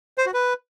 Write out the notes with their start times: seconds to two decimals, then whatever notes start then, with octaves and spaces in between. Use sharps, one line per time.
0.18 C5
0.26 F#4
0.34 B4